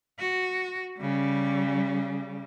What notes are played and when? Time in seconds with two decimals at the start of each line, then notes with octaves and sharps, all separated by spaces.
0.19 F#4
0.98 C#3 G3